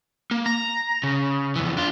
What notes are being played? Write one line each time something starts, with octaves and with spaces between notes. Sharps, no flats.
A#3
A#5
C#3
F2 E3
D4 F4